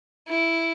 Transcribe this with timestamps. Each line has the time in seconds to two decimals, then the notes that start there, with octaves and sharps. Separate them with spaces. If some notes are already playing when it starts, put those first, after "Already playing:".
0.27 E4